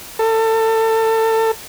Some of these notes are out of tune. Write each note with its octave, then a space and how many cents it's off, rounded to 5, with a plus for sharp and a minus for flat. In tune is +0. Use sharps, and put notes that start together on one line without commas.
A4 +25